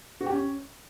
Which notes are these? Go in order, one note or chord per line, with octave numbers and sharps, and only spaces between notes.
F#4
G4
C#4